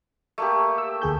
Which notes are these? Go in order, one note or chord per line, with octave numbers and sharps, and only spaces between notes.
A3 A#3 G4
E6
D2 G#4 G6